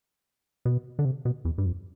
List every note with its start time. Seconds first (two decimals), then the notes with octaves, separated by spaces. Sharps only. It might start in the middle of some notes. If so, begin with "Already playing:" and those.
0.65 B2
0.99 D3
1.05 C3
1.25 B2
1.45 E2
1.58 G2
1.66 F2